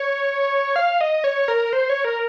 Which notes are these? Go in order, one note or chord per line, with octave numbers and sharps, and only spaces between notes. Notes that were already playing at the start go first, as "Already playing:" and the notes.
Already playing: C#5
F5
D#5
C#5
A#4
C5
C#5
A#4